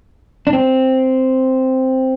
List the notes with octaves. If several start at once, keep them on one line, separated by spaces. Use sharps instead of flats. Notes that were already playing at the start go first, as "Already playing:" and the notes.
D4
C4